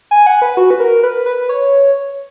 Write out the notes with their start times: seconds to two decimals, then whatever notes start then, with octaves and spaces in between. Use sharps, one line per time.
0.11 G#5
0.26 F#5
0.42 B4
0.57 F#4
0.71 B4
0.80 A#4
1.03 B4
1.26 B4
1.49 C#5